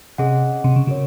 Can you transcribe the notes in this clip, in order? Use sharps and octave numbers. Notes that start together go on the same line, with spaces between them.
C3 C#4 G#4 D#5 F#5
C3
C#3
C#3 F#4 A#4 C#5